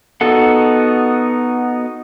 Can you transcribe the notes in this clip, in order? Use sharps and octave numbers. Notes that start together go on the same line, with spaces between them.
B3 D#4 F#4 A4 F#5